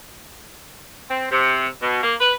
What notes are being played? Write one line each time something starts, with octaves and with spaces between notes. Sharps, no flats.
C4
C3
B2
A#3
B4